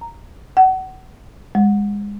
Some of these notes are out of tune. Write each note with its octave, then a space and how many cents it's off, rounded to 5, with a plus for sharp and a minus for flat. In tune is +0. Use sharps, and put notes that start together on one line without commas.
A#5 -5
F#5 +30
G#3 -25